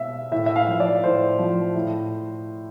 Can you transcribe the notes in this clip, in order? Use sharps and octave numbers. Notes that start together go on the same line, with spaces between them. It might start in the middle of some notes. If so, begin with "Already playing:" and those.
Already playing: B2 E5 F5
A2 E5
E5
F5
F3
D5
A2 C5
F3
A2